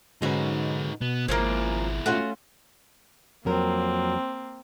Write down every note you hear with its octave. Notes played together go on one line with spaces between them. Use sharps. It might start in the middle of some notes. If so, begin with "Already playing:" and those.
G#2 D3 C#4 D#4 F#4 B4
B2 B3
G#1 F3 G#3 A#3 B3 C#4 E4
A3 C#4 F4 F#4
F2 F#3 A#3 C4 A#4